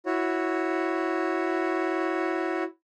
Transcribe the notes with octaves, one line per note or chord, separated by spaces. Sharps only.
E4 F#4 C#5